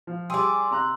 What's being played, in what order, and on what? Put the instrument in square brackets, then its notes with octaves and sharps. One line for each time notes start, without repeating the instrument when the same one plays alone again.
[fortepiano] F3
[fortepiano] G3 G5 [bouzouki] G#4 D5 [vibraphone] C6 E6
[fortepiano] C3 A#5 F#6